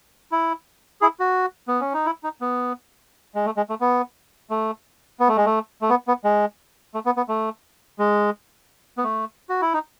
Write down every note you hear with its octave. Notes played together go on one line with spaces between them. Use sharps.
E4
E4 G#4
F#4
B3
C#4
D#4
E4
D#4
B3
G#3
A3
G#3
A3
B3
A3
B3
A3
G#3
A3
A3
B3
B3
G#3
A3
B3
B3
A3
G#3
B3
A3
F#4
E4
D#4